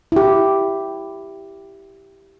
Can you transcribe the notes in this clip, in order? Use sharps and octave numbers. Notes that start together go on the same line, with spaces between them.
E4 G4